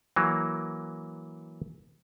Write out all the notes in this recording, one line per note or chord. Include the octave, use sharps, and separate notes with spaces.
E3 F#3 A#3